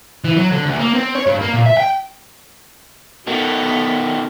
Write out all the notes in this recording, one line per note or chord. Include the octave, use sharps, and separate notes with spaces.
E3
F#3
D3
D2
A#3
C4
C#5
G2
A#3
A#2
E5
G5
B2 D#3 B3 A4 A#4